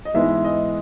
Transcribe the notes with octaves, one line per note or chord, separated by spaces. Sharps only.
D#5
G#2 E3 G#3 B3 E5
D#5